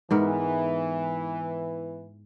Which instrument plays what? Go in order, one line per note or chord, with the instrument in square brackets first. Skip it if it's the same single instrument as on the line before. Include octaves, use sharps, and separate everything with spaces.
[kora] G#2 B3 A#4 [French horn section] E3